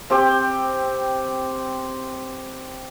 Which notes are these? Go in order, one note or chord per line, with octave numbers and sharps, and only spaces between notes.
C4 G4 G5